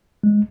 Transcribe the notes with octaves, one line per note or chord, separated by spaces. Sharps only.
G#3